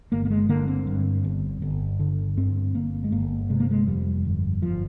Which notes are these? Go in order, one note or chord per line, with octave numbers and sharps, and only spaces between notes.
G1 A#3
A#3
G#3
D3 A#3
C4
G2
G1
G1
D3
G2 C4
G1 A#3
G#3
G1 A#3
C3 G#3
A#3
G#3
F2 G3
G1
G1 F3